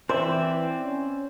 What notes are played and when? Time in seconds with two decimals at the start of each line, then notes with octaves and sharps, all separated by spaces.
0.09 E3 C4 C5 D5 E5
0.77 C#4